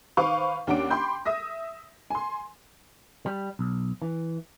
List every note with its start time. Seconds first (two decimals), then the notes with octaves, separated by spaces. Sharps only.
0.17 D#3 B4 C5 F5 C#6 D6
0.67 D#2 C#4 D4 F#5 D6 D7
0.90 G5 B5 C6 D6 G6
1.25 E5 D#6 A#6
2.10 G#5 C6
3.26 G3
3.59 B1
4.02 E3